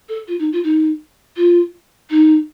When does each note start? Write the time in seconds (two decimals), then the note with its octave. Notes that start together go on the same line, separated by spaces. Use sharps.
0.09 A4
0.28 F4
0.39 D#4
0.53 F4
0.64 D#4
1.37 F4
2.10 D#4